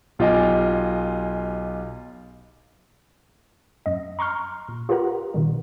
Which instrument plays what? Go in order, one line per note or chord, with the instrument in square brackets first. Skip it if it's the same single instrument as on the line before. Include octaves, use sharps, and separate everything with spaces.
[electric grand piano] B1 F4 G4 D#5 F5 G#5
[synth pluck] F#2 D#5
A#5 C6 C#6 F6
A#2
F4 G4 A#4 B4 F#5 A#5
B2 D#3 G3